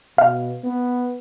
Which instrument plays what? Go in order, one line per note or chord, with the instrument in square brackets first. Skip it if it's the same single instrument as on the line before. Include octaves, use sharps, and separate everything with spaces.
[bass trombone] B2 [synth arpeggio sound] F5
[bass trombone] B3